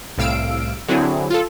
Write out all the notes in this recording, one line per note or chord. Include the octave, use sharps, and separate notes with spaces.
C2 A2 F5 E6 D7
D3 F#3 C4 E4 G#4
F4 A4